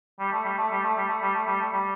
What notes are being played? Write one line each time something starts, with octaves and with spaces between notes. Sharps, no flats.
G3
A3
G3
A3
G3
A3
G3
A3
G3
A3
G3
A3
G3